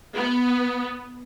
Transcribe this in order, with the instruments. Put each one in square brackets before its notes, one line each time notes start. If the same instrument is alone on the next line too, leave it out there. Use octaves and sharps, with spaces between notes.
[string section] B3